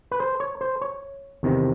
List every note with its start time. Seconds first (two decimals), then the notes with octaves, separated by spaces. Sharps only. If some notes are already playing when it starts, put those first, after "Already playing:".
0.11 B4
0.20 C5
0.40 C#5
0.61 C5
0.82 C#5
1.43 E2 C3 D#3